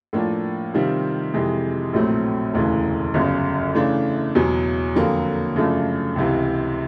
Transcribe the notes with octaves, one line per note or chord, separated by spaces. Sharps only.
A2 F3 A#3 D4
C3 D#3 G3 C4 F4
F2 C3 E3 G#3
A#1 A2 F#3 A3 C4
E1 D2 C#3 E3
G1 F#2 C#3
C#3 E3 A3 D4
E2 B2 F#3
F2 D3 F#3 A#3
F#2 C#3 F3 A3 D4
C#2 C3 E3